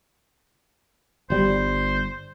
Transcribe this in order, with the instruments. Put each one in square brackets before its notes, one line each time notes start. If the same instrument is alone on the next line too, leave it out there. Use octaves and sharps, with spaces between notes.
[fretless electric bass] G1 G3 [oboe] C5